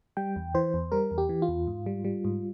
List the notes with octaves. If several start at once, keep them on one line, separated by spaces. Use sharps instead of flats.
G3 G5
E2
E3 C5
E2
G3 A#4
E2
G4
E3
F4
E2
G#2
G3
G3
G#2